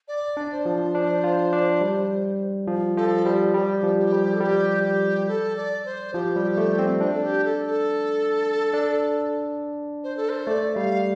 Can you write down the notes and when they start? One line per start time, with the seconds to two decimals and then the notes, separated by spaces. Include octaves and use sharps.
0.08 D5
0.37 D4
0.52 C5
0.66 F3
0.95 D4
1.24 F4
1.53 D4
1.81 G3
2.68 F3
2.97 F3 A4
3.25 G3 C5
3.54 G3 G4
3.83 F3
3.98 G4
4.12 G3
4.33 A4
4.41 G3 G4
4.84 G4
5.28 A4
5.57 D5
5.85 C5
6.14 F3 G4
6.36 G3
6.57 A3
6.79 C4
7.00 D4 F4
7.12 A4
7.22 G4
7.45 A4
7.66 A4
8.74 D4
10.04 C5
10.17 A4
10.29 C5
10.47 A3 D5
10.75 G3 F5